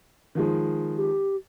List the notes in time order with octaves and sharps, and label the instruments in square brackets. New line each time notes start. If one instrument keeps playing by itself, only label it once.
[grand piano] D#3 F3 G#3
[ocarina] G4